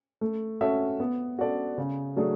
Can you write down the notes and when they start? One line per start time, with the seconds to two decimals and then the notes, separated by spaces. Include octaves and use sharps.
0.21 A3
0.61 C#4 F#4 A4 E5
1.00 B3
1.39 F#4 A4 D5
1.78 C#3
2.16 F#3 A3 D4 G#4